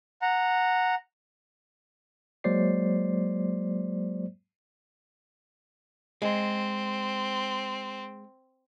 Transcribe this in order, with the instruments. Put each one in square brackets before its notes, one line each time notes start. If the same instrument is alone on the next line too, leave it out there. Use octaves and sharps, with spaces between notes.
[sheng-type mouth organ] F#5 A#5
[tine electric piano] F#3 G#3 A#3 C5 D5 C7
[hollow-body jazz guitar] G#3 [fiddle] C4